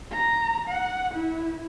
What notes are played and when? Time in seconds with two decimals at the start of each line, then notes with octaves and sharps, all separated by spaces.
0.12 A#5
0.69 F#5
1.15 E4